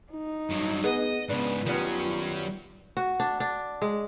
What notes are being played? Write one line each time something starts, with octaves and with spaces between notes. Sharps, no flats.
D#4
G2 F#3
B3 G#4 D#5
G#2 C#3 B3 D4 B4
D#3 F#3 G3 B3 C#4 F4
F#4
D4
D4
G#3